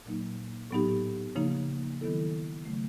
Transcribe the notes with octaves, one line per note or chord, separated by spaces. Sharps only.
A#2 F#3 A#3 D#4
A2 F#3 B3 D#4 G4
C#3 F3 A#3 D#4
D#3 F#3 B3 E4 A4
C#3 F#3 A3